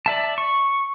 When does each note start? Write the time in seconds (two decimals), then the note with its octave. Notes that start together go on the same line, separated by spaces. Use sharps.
0.06 D5 E5 A5
0.38 C#6